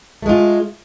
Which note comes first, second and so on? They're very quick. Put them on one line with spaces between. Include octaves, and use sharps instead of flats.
A3 G#3 F4